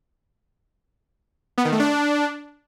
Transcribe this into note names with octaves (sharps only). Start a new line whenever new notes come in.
B3
D#3
A3
D4